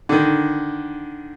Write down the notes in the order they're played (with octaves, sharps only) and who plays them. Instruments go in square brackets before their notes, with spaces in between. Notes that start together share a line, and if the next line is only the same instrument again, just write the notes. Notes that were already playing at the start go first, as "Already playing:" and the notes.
[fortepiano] D3 D#3